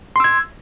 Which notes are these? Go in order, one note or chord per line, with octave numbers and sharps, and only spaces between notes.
C6 E6 G#6